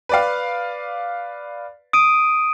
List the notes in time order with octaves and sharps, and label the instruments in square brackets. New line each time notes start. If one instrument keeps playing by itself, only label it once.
[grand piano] B4 D5 F5
[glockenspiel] D#6 D7 D#7